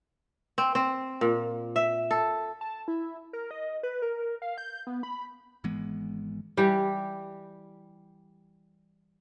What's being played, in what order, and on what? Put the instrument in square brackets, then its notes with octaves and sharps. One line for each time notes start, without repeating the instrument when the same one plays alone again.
[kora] C4
C4
A#2
E5
A4
[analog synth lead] A5
E4
A#4
D#5
B4
A#4
F5
G6
B3
B5
[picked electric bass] G#1 E3 G#3 B3
[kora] E3 G3 G4